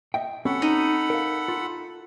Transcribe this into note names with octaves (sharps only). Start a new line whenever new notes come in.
D#5 E5 G5
C4 C#4 F#4 A4 F#5 B5
D#4
A#4 F5
F4